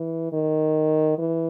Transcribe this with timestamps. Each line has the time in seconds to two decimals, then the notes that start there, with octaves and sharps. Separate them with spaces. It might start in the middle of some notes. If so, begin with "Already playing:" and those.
Already playing: E3
0.32 D#3
1.18 E3